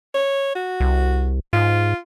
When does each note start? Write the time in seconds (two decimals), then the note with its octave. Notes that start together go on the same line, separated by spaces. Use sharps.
0.14 C#5
0.55 F#4
0.80 C2
1.53 G#2 F4